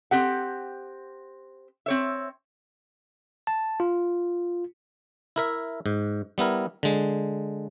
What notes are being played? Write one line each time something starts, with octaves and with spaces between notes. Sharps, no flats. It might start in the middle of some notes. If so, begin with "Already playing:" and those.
C4 G4 F#5
C4 C#5 E5
A5
F4
E4 A#4 E5
G#2
G3 B3 E4 A#4
D3 G#3